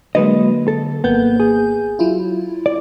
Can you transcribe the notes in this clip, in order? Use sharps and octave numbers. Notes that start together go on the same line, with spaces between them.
D3 F#3 G#3 A#3 B4 D#5
A4
G#1 A#3 B3 G6
G#4
F#3 E4 F4
D5